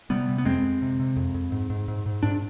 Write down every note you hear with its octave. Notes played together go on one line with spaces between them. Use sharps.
C3 G3 B3
C3
B3
F2 G#3 C4
F2
C3
C3
F2
F2
G#2
G#2
G#2
G#2
G#2 D4